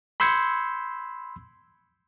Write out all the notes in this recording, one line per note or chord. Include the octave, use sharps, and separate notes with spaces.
B5 C6 E6 G6 G#6 C#7